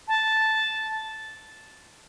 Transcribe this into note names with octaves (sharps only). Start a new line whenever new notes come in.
A5